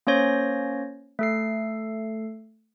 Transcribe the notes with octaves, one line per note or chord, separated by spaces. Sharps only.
A#3 C#4 C5 C#5 A#6
A3 A4 C7